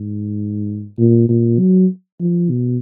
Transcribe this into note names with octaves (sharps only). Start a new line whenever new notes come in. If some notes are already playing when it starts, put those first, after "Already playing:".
Already playing: G#2
A#2
A#2
F#3
F3
B2